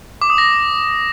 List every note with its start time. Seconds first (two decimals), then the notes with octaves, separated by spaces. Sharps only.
0.21 D6
0.30 D#6
0.38 A#6